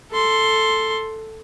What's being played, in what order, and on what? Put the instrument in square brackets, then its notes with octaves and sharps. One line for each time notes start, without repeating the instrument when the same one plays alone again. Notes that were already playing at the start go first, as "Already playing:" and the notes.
[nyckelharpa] A4 C6